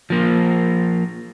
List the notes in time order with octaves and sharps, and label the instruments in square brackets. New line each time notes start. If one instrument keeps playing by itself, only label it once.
[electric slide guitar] F3 A#3